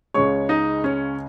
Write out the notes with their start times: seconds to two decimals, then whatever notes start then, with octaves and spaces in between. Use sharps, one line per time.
0.14 C#2 C#3 G#3 C#5 C#6
0.49 D#4 D#5
0.84 C#4 C#5